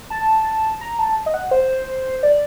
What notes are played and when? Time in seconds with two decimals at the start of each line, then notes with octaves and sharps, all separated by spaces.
0.10 A5
0.81 A#5
0.99 A5
1.26 D#5
1.34 F#5
1.51 C5
2.23 D5